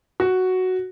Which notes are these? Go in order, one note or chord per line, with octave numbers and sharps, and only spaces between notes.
F#4